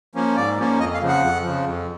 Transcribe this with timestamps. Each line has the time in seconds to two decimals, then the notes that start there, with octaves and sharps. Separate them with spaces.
0.15 F3 A#3 C#4
0.36 G#2 D5
0.57 F3 A#3 C#4
0.79 F2 D#5
0.94 F5
1.01 C#3 F3
1.08 F#5
1.22 F2
1.43 C#3 F3
1.65 F2